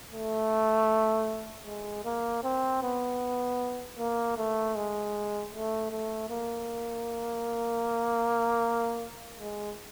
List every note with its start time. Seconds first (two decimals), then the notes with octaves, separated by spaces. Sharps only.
0.13 A3
1.66 G#3
2.05 A#3
2.44 C4
2.83 B3
3.98 A#3
4.37 A3
4.75 G#3
5.52 A3
5.91 A3
6.30 A#3
9.38 G#3